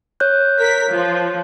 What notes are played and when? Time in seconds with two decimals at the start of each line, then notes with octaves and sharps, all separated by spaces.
0.20 C#5 F#6 G6
0.58 A#4 B6
0.90 F3